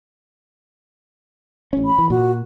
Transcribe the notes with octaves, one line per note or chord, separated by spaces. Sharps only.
A1 C#4
B5
E3
A#2 F#4